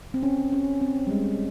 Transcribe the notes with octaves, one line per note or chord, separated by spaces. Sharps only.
C4
C#4
C#4
C4
G3
G#3